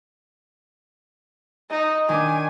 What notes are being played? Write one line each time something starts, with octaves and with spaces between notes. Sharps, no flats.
D#4 D#5
D#3 D4 G#5 D6